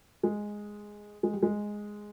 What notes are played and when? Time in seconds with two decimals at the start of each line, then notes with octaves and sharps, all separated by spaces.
0.23 G#3
1.23 G#3
1.33 G3
1.43 G#3